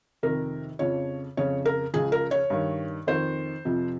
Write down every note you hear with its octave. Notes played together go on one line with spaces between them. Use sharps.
F2 C3 D#3 A#4
F2 C#3 F3 C#5
F2 C#3 F3 C#5
A#4
C#2 C#3 F3 G#4
A#4
C#5
G2 D#3
F2 D#3 C5
F2 C3 F3